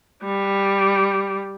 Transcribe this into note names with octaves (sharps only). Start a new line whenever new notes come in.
G3